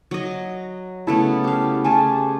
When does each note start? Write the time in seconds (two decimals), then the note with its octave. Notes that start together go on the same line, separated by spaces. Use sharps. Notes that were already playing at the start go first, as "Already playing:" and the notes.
0.11 F#3 D#5
1.07 C#3 A3 B3 E4 A5
1.44 G4 F5
1.84 A3 G4 G#4 G#5 A5